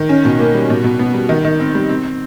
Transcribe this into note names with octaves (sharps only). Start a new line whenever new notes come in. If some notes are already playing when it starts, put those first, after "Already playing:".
Already playing: D#3
C#4
B2
A#3
G3
B2
B2
B3
G3
D#3
D#3
C4
G3
C4